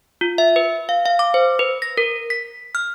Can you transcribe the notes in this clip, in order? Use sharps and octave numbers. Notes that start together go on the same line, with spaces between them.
F4
E5
B4
F5
F5
D6
C5
B4
A#6
A#4
B6
F6